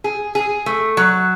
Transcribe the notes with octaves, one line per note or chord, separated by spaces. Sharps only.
G#4
G#4
A3
F#3